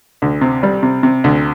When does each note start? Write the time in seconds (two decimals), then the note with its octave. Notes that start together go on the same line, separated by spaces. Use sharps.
0.22 D2
0.41 C3
0.63 G3
0.83 C3
1.03 C3
1.24 D2